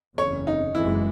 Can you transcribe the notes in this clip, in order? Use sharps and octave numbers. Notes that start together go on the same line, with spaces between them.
F#1 E2 C#3 C#5
D#4
F#1 F#2 E3 G#3 E4